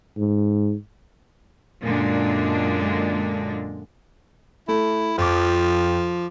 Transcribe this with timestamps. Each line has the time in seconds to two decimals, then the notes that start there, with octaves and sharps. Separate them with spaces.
0.17 G#2
1.84 F#2 A#2 D3 G#3 D4
4.68 A3 E4
5.18 F2 F3 D6